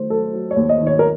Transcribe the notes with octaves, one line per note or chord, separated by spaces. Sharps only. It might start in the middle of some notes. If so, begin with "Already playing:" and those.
Already playing: D#3 A3 C5
F#3 A4
F#3
C#5
D#2
D#5
D#3
C#5
A#4